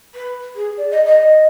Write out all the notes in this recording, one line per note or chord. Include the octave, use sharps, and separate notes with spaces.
B4
G#4
D5
D#5
D#5